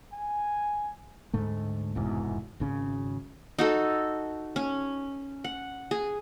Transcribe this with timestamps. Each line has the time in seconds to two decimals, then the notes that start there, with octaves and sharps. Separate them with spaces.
0.13 G#5
1.33 D2 G#2 A3
1.95 F1 E2 G#2 B2
2.60 G#1 C#3 C#4
3.59 D#4 F#4 A4
4.56 C#4
5.44 F#5
5.91 G#4